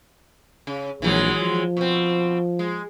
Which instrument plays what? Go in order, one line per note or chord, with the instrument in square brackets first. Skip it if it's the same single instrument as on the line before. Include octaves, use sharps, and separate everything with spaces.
[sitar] C#3
[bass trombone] A#1 [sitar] E3 F#3 G#3
[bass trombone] F3
[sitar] B2 C4
G#3